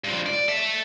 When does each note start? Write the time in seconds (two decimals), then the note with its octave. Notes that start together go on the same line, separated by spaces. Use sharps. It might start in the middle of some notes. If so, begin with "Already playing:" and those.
0.04 G2 F3
0.26 D5
0.48 A4 E5